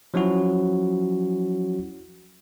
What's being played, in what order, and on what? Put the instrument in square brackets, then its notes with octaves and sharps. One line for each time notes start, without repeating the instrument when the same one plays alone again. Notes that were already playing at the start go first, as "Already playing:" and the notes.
[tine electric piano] F3 F#3 C#4 E4 F#4